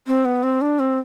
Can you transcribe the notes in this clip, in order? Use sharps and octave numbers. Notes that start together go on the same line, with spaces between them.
C4
B3
C4
D4
C4